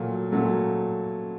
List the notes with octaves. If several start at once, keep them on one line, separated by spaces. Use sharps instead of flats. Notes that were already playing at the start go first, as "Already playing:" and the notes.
Already playing: A#2 F#3 A3
A#2 F#3 A3